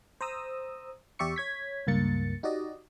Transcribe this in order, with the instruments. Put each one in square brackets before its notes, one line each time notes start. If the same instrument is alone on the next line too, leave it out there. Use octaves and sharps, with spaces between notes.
[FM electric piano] C5 A#5 D#6 E6
E2 G4 D5 E5 C#6 C#7
C#5 G#6 B6
C#2 G2 A#3 A6 C#7
D#4 F#4 G4 D5 D#5